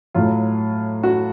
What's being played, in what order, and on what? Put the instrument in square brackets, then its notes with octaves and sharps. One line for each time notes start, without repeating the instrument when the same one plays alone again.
[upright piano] A2 F#3 F4
F#4